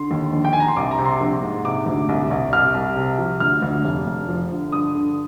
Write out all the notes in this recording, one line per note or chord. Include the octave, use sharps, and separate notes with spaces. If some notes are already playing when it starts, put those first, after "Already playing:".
Already playing: D3 C6
D#2
A#1
G5
A#1 G#5
A#5
C6
C2 D6
A#5
C3
C6
A#1
G#2
C3 D6
D2
C2
C2
C2 F6
C2
C3
F3
D2 F6
D2
F1
F1
F3
D3
G2 D#6
D3